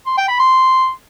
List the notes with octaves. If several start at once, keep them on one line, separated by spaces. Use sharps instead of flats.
C6
G5
B5
C6